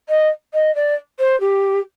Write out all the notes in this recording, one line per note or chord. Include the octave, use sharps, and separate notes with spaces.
D#5
D#5
D5
C5
G4